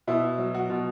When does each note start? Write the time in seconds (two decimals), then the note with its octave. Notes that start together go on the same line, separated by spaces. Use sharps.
0.07 B2 E4
0.38 F#3
0.54 F#4
0.70 B2